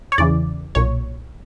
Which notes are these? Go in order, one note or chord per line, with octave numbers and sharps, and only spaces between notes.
C#5
E2 C#3 E3 D5
B1 A#2 C#5